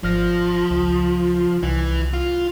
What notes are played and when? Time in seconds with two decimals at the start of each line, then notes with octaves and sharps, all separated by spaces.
0.03 G#1 F3 F6 A#6
0.70 C#2
1.63 C2 E3
2.13 F4